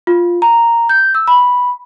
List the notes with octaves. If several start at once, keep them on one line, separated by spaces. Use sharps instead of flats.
F4
A#5
G6
E6
B5